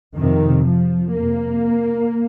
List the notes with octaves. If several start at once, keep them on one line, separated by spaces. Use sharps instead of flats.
F2 C3 D#3
F3
F2 C3 A#3